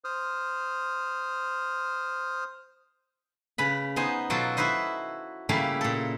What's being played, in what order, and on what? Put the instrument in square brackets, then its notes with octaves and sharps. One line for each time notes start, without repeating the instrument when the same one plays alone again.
[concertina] C5 D#6 F6
[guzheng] C#3 B4 B5
B3 D#4 C5 G#5
B2 F#3 F4 F#4 A4
E4 F#4 B4 C5 D#5
C#3 G3 A3 A#3 E4 F5
A#2 A4